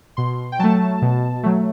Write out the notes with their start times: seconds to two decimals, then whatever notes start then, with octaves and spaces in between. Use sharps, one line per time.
0.17 B2 C6
0.52 G5
0.59 F#3 A3 A5
1.02 B2
1.43 F#3 A3